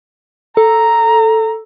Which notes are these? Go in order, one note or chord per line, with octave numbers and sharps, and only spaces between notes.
A4 A#5